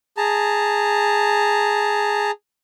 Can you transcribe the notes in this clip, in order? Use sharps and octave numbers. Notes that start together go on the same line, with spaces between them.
G#4 A5 A#5